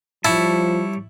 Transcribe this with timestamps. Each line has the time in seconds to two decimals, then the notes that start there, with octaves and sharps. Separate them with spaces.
0.25 F3 G3 E4 C#5 A5